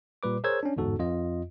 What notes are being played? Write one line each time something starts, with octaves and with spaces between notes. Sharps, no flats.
A#2 G3 B4 D6
G#4 A#4 C5 C#5 E6 G#6
C#4 D4
G1 E2 G#2 F#4 A4
F2 F4 D#5